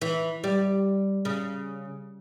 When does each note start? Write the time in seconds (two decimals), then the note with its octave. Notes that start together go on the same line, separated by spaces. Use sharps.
0.01 E3
0.44 G3
1.25 C#3